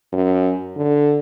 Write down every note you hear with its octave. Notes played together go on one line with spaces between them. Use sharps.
F#2
D3